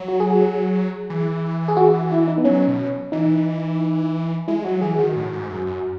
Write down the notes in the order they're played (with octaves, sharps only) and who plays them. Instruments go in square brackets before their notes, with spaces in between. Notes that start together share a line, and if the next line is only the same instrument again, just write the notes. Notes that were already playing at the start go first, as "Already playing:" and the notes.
Already playing: [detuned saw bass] F#3
[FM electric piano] F#4
G#4
F#4
G#4
[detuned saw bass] E3
[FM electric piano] G#4
F#4
E4
D#4
B3
[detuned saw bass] F#3 [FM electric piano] C#4
[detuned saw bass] B2
[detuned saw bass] E3 [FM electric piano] D#4
[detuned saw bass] G#3 [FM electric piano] E4
[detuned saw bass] F#3 [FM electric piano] F#4
[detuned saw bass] E3 [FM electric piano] G#4
[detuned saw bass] D#3 [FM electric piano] F#4
[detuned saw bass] A2
G#2
F#2
F#2